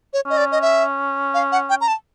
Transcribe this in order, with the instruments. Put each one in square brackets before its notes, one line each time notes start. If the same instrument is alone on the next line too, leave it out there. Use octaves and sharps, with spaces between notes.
[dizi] C#5
[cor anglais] C#4 [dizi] D#5
[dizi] D5
D#5
E5
F5
F#5
G5
A#5
A5